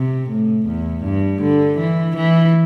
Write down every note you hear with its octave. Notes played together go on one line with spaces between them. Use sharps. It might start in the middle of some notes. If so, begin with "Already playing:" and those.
Already playing: C3
A2
E2
G2
D3
E3
E3